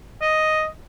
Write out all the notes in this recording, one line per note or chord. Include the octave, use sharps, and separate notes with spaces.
D#5